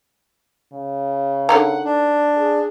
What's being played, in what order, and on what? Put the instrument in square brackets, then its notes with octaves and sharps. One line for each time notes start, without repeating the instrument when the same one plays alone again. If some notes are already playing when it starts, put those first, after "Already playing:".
[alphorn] C#3
[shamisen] D3 D#3 A#5 [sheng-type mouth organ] F#5
[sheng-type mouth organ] D4
[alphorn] G#4